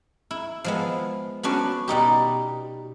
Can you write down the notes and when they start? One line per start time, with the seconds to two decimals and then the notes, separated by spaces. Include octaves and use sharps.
0.31 E4
0.64 F3 G#3 B3
1.43 B3 C#4 D4 F#4
1.88 B2 G3 D#4 G4